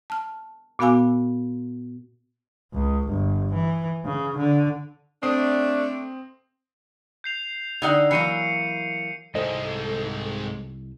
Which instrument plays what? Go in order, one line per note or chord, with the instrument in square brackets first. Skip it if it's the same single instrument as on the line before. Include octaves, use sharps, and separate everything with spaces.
[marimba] A5 F6
A#2 B3 F#4 F5 G#5 E6
[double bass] C#2
G1
E3
C#3
D3
[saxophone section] A3 D4 [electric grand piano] C4 D#6 C7
[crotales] G6 C7 F7
[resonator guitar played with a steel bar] D3 D#4 F#5
[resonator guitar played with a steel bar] E3 F#3 A#3 [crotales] C7 C#7 D#7
[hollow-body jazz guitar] C2 C5 D#5 [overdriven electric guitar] G#2 [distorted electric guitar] G#3 C4 [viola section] A4